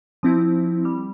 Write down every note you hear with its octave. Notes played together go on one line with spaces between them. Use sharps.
F3 C4 E4
G3